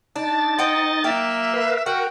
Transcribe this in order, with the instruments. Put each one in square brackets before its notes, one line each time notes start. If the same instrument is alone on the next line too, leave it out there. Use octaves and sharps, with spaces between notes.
[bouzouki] D4 [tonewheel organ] D#4 A6
[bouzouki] C5 F#5 G5 [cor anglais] D#5
[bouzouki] F#3 G5 [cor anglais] A#3 [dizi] E5
[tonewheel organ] A#4 B4 F5
[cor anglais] F#4 [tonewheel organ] A#4 [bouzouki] F#5 [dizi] G5